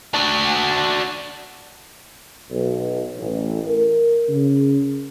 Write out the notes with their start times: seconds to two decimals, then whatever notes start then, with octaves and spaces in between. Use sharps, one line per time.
0.14 D4 F#4
2.50 B1
3.16 A1
3.67 A#4
4.29 C#3